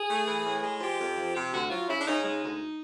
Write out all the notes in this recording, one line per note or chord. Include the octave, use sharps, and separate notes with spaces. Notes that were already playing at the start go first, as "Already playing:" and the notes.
Already playing: G#4
A3
E3
A2
G#3
F3 G4
F2
F3
C3 G4
D2 F#4
F#3 F4
C#3 E4
D4
C#3 D#4
G#3 D#4
D2